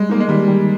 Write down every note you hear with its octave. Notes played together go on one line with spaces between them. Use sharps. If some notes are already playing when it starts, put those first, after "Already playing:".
Already playing: G3 G#3
A#3 D#4
G#3
D#3 G3
G3